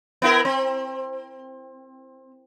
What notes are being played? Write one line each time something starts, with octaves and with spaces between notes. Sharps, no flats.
B3 E4 A#4
C4